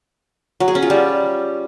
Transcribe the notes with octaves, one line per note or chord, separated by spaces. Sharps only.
F#3
G#4
C#4
F4
G3